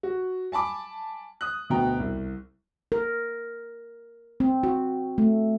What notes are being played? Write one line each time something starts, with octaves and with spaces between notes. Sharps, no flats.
F#4
G#5 A5 B5 D6
D#6 F#6
D2 B2 B3 G5 A#5
C2
A#4
C4
F#4
A3